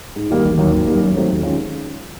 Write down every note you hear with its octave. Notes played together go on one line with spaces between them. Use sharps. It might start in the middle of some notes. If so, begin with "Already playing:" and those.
G#2
D#3 G3 A#3 D#4
E1
D#2 D#3 F#3 A#3
G#1
F#2 D#3 G3 A#3
F#2
D#3 F#3 A3 C4
D#2
D#3 G#3 C#4 F4